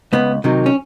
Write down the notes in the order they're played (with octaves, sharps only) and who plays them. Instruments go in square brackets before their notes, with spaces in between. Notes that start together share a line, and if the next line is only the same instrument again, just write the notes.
[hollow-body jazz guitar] C#2 B3
C3 D#3 F#3
C#4